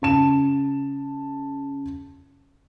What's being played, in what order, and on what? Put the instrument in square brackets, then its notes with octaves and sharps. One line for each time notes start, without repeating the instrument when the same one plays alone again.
[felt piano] C#3 A5 E7